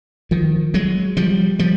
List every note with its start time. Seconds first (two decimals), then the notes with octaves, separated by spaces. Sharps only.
0.31 D#3 F3
0.74 F#3 G#3
1.17 F3 G3
1.59 F3 G3